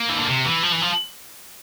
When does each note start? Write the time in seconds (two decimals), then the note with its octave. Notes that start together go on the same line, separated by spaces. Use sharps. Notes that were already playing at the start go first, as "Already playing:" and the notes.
Already playing: A#3
0.08 E3
0.18 D3
0.28 C3
0.45 E3
0.63 F3
0.72 E3
0.82 F3